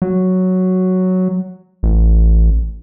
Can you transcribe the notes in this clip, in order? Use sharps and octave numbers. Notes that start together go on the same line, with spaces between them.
F#3
A1